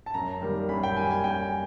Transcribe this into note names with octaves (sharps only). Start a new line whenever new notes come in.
A5
F#2 A#5
D#3 G3 A#3
F#2 B5
G5
D#3 G3 A#3 G#5
G#5
F#2 G5
G#5